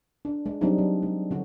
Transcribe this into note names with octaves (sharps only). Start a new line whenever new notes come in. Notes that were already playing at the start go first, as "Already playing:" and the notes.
D4
G#3
F#3 G3 C4 D4 D#4
F#3
G#3
D3 C#4 F#4